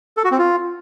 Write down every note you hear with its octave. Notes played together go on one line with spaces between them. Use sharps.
A4
F#4
C4
F4